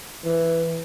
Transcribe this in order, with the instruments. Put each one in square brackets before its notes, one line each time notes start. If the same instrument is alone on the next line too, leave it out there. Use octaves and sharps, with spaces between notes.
[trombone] E3